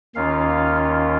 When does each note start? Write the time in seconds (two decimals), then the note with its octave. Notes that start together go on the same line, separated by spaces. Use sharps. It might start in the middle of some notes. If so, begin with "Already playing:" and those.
0.15 D#2 D#3 C#4 F4 F5